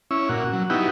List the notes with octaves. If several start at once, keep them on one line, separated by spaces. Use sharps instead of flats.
C#4 E4
A#2 F#4
F#3
B3 D#4 E4 F#4 G4